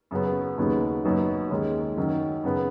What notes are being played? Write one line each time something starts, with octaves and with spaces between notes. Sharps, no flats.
F#2 C#3 F#3 B3
D#2 C#3 F#3 B3 D#4
F#1 F#2 F#3 B3 D#4
D#2 D#3 G#3 C#4
F#2 D#3 F#3 C#4
F#2 C#3 B3